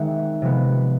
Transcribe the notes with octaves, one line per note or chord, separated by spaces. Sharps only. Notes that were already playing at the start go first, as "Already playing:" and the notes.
Already playing: D#3 G#3 C4 E5 F#5
C3 F3 G#3 B3